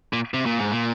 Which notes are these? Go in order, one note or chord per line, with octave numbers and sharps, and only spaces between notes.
A#2
C3
A#2
G#2
A#2